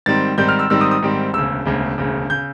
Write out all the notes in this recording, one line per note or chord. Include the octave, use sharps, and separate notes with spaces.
G#2 D#3 G3 C4 A6
G#2 D#3 G3 C4 G6
F6
E6
G#2 D#3 G3 C4 E6
D#6
D#6
G#2 D#3 G3 C4
E1 D2 C#3 E6
E1 D2 C#3
E1 D2 C#3
C#3 G6